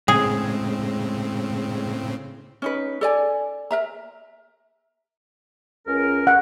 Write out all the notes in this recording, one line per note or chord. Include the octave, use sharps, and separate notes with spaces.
A2 C#3 G#3 C4 G#4
C#4 D#4 B4
A4 D5 G#5
A#4 E5 A#5
C#2 C#4 A#4
F#5